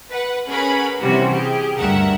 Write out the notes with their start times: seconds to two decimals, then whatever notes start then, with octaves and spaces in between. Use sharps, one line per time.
0.10 B4 F#5
0.48 C#4 G#4 A#4 B4 F#5 B5
1.01 C3 E3 G3 C#4 F#4
1.33 G4 G#4
1.78 D2 G2 A#4 E5 F#5